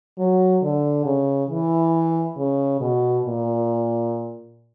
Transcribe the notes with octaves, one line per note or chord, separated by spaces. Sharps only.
F#3
D3
C#3
E3
C#3
B2
A#2